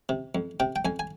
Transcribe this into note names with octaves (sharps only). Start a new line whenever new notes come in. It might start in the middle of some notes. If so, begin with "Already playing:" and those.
C3
F2
C3 G5
G5
F2 G#5
G#5